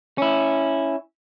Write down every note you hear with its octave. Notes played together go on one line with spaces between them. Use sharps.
C#4 E4